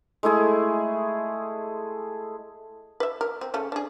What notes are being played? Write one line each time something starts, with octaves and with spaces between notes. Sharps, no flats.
G#3 A3 E4 G#4
B4 E5
A#4
C4
C#3 A3 C#4
D4 G#4